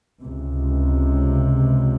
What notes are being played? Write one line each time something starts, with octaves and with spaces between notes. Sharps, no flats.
C#2 C3